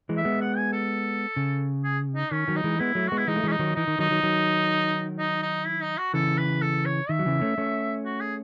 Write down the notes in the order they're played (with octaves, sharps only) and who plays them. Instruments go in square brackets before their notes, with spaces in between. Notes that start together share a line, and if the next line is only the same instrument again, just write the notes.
[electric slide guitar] E3 G#3
[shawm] E5
[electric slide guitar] G#3 B3
[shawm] F#5
G#5
A4
[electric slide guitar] C#3
[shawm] G#4
D#4
[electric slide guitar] D#3 [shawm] C#4
[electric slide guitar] D#3 F#3
[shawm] D#4
[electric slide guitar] E3 G#3
[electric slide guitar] G#3 B3 [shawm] E4
[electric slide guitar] F#3 A3
[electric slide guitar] G#3 B3 [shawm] F#4
[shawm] E4
[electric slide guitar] E3 G#3 [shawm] D#4
[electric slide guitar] A3
[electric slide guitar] E3 G#3 [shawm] C#4
[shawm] D#4
[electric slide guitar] D#3 F#3
[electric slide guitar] E3 [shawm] D#4
[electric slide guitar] D#3
[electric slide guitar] D#3 F#3 [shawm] D#4
[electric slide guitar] D#3 F#3
D#3 F#3
[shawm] D#4
D#4
E4
D#4
F#4
[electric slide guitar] C#3 E3 [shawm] A4
[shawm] B4
A4
C#5
[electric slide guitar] D#3 [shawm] E5
[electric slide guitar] F#3
C#3 E3
A3 C#4
A3 C#4
[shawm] F#4
G#4